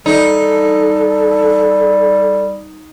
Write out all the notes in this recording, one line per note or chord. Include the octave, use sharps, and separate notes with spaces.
G3 D#4 A4